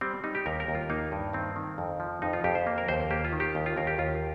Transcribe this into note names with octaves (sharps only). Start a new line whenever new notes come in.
G3 C4
G3 D#4
G4
D#2 A#4
A#4
D#2
F4
A#3 D#4
G2
D#3 C4
D#3
F2
F3
F2 D#4
F4
F2 G4
C5
A#3
A#4
D#2 C5
A#3 G4
F4
D#3
G4
D#2
F4
D#2 A#4
G4
D#2 F4